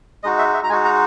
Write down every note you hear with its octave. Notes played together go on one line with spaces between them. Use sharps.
G#3 D#4 F#4 D#5
E5
E5
A#5
G#3 D#4 F#4 G#5
A#5